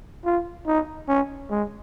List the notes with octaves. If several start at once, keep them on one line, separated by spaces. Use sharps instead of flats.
F4
D#4
C#4
G#3